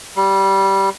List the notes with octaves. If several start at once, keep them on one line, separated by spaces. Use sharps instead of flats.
G3